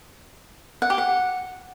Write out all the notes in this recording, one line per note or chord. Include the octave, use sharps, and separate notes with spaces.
F#5
G4
F#5